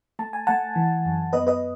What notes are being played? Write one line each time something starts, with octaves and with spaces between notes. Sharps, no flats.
A3 A5
G#5
A3 F#5 A5
E3
F#2
B3 B4 D#5
B4 D#5